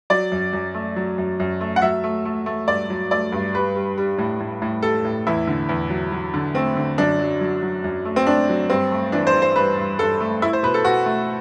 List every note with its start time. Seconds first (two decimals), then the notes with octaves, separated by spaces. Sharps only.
0.10 F#3 D5
0.32 F#2
0.53 F#2
0.74 A3
0.96 F#3
1.18 F#2
1.40 F#2
1.61 A3
1.76 F#5
1.82 F#3 E5
2.04 A3
2.25 A3
2.46 A3
2.68 G2 D5
2.90 F#3
3.11 A3 D5
3.32 G2
3.54 G3 B4
3.76 G3
3.98 G3
4.18 A2
4.40 A2
4.62 A2
4.83 G3 A4
5.05 A2
5.27 E2 E4
5.47 D3
5.69 E2
5.90 F#3
6.12 F#3
6.34 D3
6.55 A3 C4
6.77 D3
6.98 F#2 D4
7.19 F#3
7.41 F#3
7.62 F#3
7.84 F#2
8.05 A3
8.16 C4
8.27 A3 D4
8.49 F#3
8.70 G2 C4
8.91 A3
9.12 E3 D4
9.27 C5
9.34 E3
9.42 C5
9.56 G2 B4
9.77 G2
9.99 G2 A4
10.20 A3
10.42 A3 E4
10.53 C5
10.63 B2 B4
10.74 A4
10.85 B2 F#4
11.06 A3